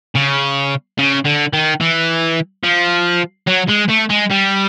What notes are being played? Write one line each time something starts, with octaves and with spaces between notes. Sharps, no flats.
C#3
C#3
D3
D#3
E3
F3
F#3
G#3
A3
G#3
G3